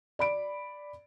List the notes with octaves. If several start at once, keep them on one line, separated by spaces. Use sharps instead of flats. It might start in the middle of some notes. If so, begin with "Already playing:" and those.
D5 B5 D7